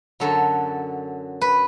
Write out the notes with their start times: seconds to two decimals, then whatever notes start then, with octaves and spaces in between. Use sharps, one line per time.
0.20 F#2 D3 F#3 A4
1.41 B4